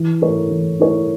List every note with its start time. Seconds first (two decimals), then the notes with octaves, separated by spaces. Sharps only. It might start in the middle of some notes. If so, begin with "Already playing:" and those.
Already playing: E3
0.22 A3 E4 A#4 C#5
0.51 E3
0.79 A3 E4 A#4 C#5